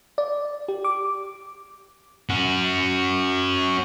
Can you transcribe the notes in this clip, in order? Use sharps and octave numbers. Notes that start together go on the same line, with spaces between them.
D5
G4
D6
C#4 F#4